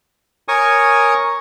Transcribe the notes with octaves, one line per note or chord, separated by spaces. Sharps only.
A#4 C#5 G#5 C#6 D#6